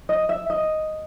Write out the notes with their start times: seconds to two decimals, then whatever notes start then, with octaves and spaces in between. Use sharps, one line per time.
0.09 D#5
0.29 E5
0.50 D#5